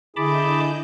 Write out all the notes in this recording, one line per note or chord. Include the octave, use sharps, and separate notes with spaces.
D3 E4 G#4 D#5 A5 B5 D6 G6